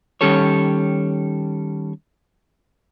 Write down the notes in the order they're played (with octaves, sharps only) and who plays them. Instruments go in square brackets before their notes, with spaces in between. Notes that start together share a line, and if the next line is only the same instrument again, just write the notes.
[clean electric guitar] D#3 G3 C#4 G4 A4 C#5